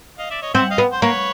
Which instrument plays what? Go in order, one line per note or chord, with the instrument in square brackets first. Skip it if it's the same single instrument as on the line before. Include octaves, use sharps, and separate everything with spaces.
[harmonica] D#5 F5
D5 E5
C#5 D#5
[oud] C4 [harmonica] E5 F#5
[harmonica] D#5 F5
[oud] B3
[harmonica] C5
[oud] A#3 [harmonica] B4 C#5